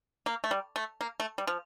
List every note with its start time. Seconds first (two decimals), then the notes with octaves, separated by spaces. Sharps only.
0.26 A#3
0.44 A3
0.51 G3
0.76 A3
1.01 A#3
1.20 A3
1.38 G3
1.47 F3